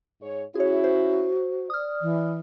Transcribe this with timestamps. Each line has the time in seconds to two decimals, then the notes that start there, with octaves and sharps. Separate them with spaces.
0.21 G#2 G#4 C#5
0.55 C#4 E4 F#4 G#4 C#5
0.84 C5
1.70 D5 D#6 F6
2.02 E3